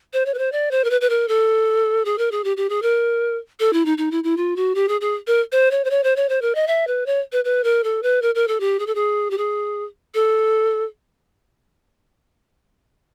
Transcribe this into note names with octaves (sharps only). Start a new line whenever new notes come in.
C5
C#5
B4
C5
D5
C5
A#4
B4
B4
A#4
A4
G#4
A#4
G#4
G4
G4
G#4
A#4
A4
E4
D#4
D#4
E4
E4
F4
F#4
G4
G#4
G#4
A#4
C5
C#5
C5
C#5
C5
C#5
C5
A#4
D#5
E5
B4
C#5
B4
B4
A#4
A4
B4
A#4
A#4
A4
G4
G#4
A4
G#4
G4
G#4
A4